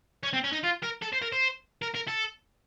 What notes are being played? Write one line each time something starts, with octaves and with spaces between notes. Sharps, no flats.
C#4
C4
C#4
D#4
F4
A#4
A4
C5
A#4
C5
A#4
A#4
A4